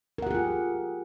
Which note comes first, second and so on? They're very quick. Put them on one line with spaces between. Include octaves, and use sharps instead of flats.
A#4 F#5 G4 G#4 F4